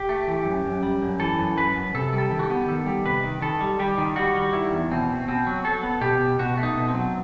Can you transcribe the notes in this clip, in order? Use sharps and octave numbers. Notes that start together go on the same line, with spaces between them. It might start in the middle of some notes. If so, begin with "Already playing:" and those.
Already playing: G4
A3
E3
F#2
F#2
G3
F#2
E3 A4
F#2
F#2 B4
F#2
C3 A4
G3
A4
D#3
F#4
G4
B3
D#3 A4
G3
C3 B4
D#3
D#3 A4
G3
G3 G4
D#3
G3 F#4
G3
D#3 E4
E2
B2 C4
B2
B2 C4
F#3
F#3 A4
B3
B2 G4
B2
B2 F#4
A3
D#4
B2
C4
F#3